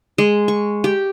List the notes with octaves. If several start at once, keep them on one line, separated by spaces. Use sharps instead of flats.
G#3
C#6
G4